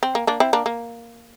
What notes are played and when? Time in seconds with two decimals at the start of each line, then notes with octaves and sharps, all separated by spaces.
0.03 C4
0.15 A#3
0.27 A#3 D4
0.40 C4 E4
0.53 A#3 D4
0.66 A#3